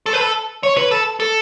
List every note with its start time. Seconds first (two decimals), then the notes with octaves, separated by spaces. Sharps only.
0.06 A4
0.13 B4
0.21 A4
0.63 C#5
0.77 B4
0.91 A4
1.20 A4